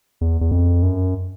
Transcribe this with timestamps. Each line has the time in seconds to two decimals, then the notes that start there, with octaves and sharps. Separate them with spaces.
0.21 E2
0.41 E2
0.51 F2
0.82 F#2